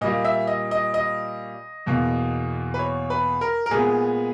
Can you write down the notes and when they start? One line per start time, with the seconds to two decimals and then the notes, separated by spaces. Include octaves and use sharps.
0.01 A#2 G3 A#3 D#5
0.25 E5
0.47 D#5
0.71 D#5
0.94 D#5
1.86 E2 B2 A#3
2.74 B4
2.79 C#5
3.10 B4
3.41 A#4
3.66 A#4
3.71 A#2 G#3 B3 G#4